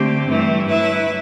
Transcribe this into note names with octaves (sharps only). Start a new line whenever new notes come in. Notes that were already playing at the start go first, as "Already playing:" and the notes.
Already playing: D3 A3 C4 G4
G2 E3 A3 E4
F#3 A3 E4 B4 E5